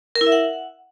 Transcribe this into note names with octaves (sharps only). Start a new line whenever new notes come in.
A#4
E4
E5
F#5